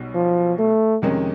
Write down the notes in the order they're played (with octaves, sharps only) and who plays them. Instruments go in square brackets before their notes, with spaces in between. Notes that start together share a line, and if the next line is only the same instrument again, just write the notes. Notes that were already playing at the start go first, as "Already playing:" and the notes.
Already playing: [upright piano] B1 B2 G3
[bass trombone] F3
A3
[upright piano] F2 C3 D#3 G#3 C#4